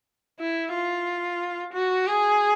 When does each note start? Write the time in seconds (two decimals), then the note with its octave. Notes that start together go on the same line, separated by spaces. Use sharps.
0.39 E4
0.73 F4
1.73 F#4
2.07 G#4